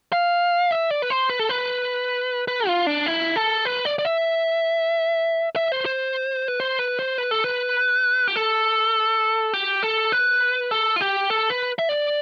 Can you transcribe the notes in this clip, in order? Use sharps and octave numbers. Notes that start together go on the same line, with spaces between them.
F5
E5
D5
B4
C5
B4
A4
B4
B4
F4
D4
E4
A4
B4
D5
D5
E5
E5
C5
C5
B4
C5
B4
C5
B4
A4
B4
G4
A4
G4
A4
B4
A4
F4
G4
A4
B4
E5
D5